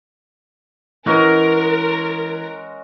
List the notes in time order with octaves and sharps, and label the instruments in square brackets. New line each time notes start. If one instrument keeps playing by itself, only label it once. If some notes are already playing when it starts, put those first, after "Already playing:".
[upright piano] E3 [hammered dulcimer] G#3 C#4 F#4 [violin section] A#4